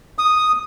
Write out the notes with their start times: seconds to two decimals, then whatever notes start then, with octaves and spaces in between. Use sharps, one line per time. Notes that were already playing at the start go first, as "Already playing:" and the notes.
0.19 D#6